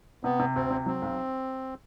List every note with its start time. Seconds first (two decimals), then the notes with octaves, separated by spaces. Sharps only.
0.24 C3 B3
0.39 C3
0.55 D2 C4
0.70 C3
0.86 F#3 C4
1.02 B1